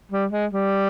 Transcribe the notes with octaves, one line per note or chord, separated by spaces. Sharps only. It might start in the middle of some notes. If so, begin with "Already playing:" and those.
G3
G#3
G3